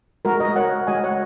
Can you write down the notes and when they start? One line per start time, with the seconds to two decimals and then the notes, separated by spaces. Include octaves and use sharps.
0.25 G#3 F#4 A#4
0.40 A#4 D#5
0.56 C#5 F#5
0.87 G#3 F#4 D#5 G#5
1.04 C#5 F#5